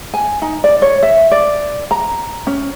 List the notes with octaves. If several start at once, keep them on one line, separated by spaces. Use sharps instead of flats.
G#5
D#4
D5
C#5
E5
D5
A#5
C#4